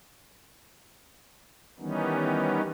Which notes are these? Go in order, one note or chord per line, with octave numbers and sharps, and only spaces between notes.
D#3 E3 G3 B3 C#4 D#4